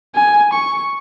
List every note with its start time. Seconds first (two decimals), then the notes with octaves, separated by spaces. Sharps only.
0.15 G#5
0.53 C#6